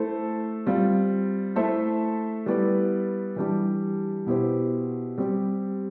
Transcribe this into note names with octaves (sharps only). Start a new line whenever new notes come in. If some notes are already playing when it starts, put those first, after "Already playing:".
Already playing: A3 E4 A4 C5
G3 C4 F4
A3 E4 A4 C5 E5
G3 B3 E4 B4 D5
E3 G3 D4 G4
B2 B3 E4 G4 C5
G3 C4 G4